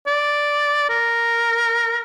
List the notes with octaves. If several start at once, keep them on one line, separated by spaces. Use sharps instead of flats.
D5
A#4